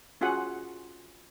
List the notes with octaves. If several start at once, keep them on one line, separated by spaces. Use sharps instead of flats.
C#4 F4 F#4 G#4 F#5 G#5